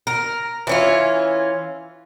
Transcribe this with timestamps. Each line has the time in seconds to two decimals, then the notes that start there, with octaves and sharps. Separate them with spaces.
0.07 A#4
0.67 E3 C#4 F4